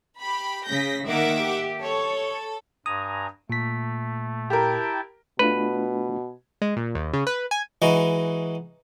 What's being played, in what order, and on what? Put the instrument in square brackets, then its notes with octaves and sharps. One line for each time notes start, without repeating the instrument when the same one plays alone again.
[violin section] G4 B5
[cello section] C#3 [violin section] G6 A#6 B6
[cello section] D#3 A#3 [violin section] E5 F#5 D6
[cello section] G4
[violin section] A4 [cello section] C#5
[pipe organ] G2 G#5 A#5 [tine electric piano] D#6
[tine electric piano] A#2 B6 [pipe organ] A3
[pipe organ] E4 G5 A5 [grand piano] G4 A#4
[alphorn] B2 [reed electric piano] A3 D4 F4 [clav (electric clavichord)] B4
[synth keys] G#3
A#2
D#2
C#3
B4
G#5
[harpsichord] E3 G#3 D#4 F#4